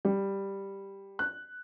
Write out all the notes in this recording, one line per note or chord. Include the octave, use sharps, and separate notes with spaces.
G3
F#6